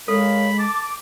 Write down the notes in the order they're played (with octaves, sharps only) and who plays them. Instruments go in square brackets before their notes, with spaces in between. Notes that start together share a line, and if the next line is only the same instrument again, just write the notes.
[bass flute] G#3 [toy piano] A4 [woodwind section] A#4 C#5 F5 [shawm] B5
[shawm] A5 [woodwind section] D6